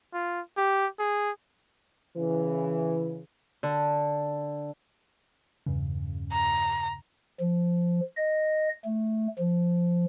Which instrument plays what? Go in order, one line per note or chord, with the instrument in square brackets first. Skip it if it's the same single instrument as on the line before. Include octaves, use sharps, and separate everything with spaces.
[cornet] F4
G4
G#4
[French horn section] C#3 E3
[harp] D3
[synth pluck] E2 G2 C#3
[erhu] A#5
[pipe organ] F3
D#5
A3
F3